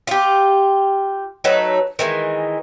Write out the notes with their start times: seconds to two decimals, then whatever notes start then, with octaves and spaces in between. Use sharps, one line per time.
0.07 F4 G4
1.44 F#3 A3 D#4 B4
1.99 D#3 E3 G#3